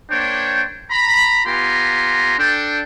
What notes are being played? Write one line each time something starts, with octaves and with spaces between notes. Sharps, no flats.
A#3 D4 C5 C#5 G5
A#5 B5
B3 F4 G4 G#5 A#5 C6
D4 A4 G5